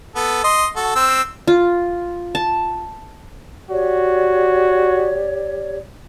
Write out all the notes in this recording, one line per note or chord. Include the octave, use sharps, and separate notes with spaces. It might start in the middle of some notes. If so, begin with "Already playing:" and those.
B3 A4
D#5 C6
F#4 A4
C4 E6
F4
A5
F#4 G4 C#5 D5